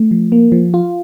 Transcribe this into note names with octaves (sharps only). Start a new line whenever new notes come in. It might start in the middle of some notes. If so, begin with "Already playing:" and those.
Already playing: A3
F3
A#3
F3
F4